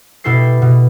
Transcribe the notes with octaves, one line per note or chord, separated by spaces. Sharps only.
B2 E4 G4 A4 C7
B2